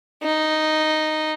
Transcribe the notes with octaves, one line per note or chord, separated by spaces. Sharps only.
D#4